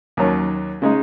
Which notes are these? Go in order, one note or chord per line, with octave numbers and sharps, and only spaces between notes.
D#2 D#3 F#3 C#4
C#3 G#3 D#4